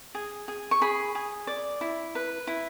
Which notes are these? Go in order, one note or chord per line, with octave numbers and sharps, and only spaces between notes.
G#4
G#4
C#6
G#4 B5
G#4
D5
E4
B4
E4